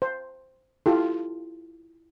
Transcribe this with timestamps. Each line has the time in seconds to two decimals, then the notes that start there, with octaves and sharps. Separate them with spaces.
0.02 C5
0.86 E4 F4 G4 A4